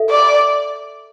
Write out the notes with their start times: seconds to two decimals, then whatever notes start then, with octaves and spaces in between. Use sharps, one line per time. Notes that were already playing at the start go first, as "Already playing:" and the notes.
Already playing: A4 E5
0.10 D5